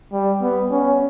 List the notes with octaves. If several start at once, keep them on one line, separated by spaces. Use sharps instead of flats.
G3
B3
C#4